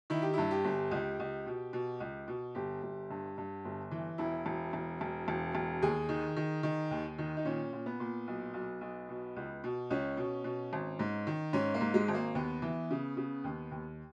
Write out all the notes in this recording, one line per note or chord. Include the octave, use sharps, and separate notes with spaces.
D#3 E4
G4
G2 E4
G4
G1
C#2
C#2
B2
B2
C#2
B2
G1 G4
G1
G2
G2
G1
E3
E1 E4
E1
E1
E1
E1
E1
D#2 G#4
D#3
D#3
D#3
D#2
D#3
D#4
A#2 C#4
A#2
B3
A#2
B1
B1
B1
B2
C#2
B2
C#2 C#4
B2
B2
G#1
G#2
D#3
G#2 C#4
A#3
G#2
G#3
G#1
A#3
D#2 B3
E3
C#3
C#3
D#2
D#2